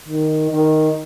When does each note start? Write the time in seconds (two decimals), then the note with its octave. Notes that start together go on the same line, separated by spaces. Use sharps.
0.08 D#3
0.50 D#3